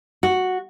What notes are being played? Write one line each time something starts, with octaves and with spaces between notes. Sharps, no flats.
F#4